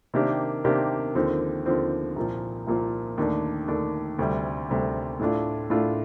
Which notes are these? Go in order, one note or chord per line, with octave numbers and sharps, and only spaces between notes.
C3 D#3 A#3 D4 G4
C3 D#3 A#3 D4 G4
D#2 D3 F3 C4
D#2 D3 F3 C4
C2 A#2 F3
C2 A#2 F3
D#2 D3 A3 D4
D#2 D3 A3 D4
D2 C3 G3
D2 C3 G3
A2 A3 D4 F4
A2 A3 D4 F4